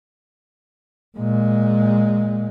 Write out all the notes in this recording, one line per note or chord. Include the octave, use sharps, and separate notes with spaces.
A#2 G#3